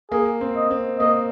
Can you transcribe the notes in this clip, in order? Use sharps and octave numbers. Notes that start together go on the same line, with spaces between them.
A#3 G#4
C4
D#5
C4
A#3 D#5